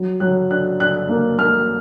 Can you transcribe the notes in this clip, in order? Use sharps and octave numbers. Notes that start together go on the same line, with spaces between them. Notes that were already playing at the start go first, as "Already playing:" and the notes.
Already playing: F#3
F#3 F#6
D4 F#6
D4 F#6
A#3
A#3 F6